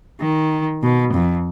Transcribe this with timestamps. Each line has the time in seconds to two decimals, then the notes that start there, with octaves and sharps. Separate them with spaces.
0.21 D#3
0.83 B2
1.13 F2